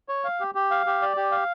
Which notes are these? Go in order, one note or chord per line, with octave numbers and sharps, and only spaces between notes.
C#5
F5
G4
G4
F5
G4
D5
G4
F5